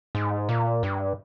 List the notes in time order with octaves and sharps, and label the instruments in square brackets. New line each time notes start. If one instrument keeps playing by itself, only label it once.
[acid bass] G#2
A#2
G2